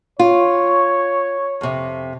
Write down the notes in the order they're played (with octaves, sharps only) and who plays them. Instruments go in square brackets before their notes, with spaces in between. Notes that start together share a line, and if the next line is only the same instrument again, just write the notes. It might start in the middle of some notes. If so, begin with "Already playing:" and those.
[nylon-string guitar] F4 [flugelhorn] C#5
[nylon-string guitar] F2 C3